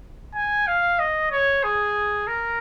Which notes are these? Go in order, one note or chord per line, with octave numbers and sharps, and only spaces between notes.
G#5
F5
D#5
C#5
G#4
A#4